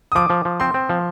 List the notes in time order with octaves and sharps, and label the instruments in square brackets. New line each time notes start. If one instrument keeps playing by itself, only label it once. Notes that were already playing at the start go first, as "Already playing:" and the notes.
[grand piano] D#6
[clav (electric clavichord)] F3 [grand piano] D6
[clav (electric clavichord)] F3
F3
[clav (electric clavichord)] C4 [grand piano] C6
[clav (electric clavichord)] C4
F3